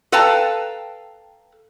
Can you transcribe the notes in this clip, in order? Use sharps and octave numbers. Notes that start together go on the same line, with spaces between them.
A4 B4 F5 G5 A5 A#5